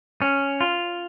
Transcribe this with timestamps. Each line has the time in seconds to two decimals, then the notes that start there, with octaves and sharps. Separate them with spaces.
0.22 C#4
0.61 F4